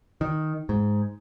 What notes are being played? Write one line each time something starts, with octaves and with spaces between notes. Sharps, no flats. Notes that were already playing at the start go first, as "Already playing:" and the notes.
D#3
G#2